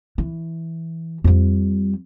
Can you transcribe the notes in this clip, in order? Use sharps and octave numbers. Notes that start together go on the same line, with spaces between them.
E3
F2 G3